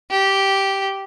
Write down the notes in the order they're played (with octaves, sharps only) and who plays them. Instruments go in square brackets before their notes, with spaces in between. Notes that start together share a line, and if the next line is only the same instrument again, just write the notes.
[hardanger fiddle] G4